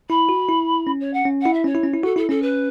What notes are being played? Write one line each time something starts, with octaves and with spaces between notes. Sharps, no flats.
E4 B5
F#4
E4
C#4
C#5
F#5
C#4
E4 F#5
E5
C#4 C#5
E4
C#4
E4
F#4 A4
E4 A4
C#4 A4
B4